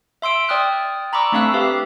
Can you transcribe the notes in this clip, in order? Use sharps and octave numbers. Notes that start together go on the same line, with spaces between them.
E5 C6 E6 D7
D5 G5 D#6 F6 F#6
A#5 B5 C#6 D6 E6
A3 C4 D4 F5 E6 F#6
G4 B4 E5 F5